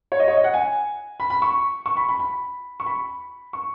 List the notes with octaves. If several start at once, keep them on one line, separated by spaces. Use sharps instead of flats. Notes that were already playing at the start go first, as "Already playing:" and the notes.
C#5
D#5
C#5
D#5
F#5
G#5
B5
B5
C#6
C#6
B5
B5
B5
C#6
B5
C#6